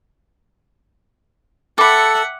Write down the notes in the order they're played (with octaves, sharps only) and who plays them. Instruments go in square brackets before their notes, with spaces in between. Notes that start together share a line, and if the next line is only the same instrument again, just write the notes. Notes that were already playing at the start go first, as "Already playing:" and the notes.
[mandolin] A4 B5 [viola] E5 F#5 [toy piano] G5 D6